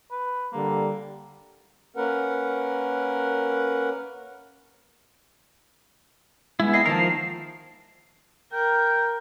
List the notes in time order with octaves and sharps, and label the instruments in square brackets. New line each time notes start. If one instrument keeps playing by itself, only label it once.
[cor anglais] B4
[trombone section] D3 G3 [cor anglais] A#3
[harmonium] A#3 C#4 A#4 B4 F#5
[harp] G#3 [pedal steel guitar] B3 E4
[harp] A#3 D#5 G5 [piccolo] C7
[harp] D#3 A5 [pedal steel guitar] F3 A#4
[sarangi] A#4 [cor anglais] G5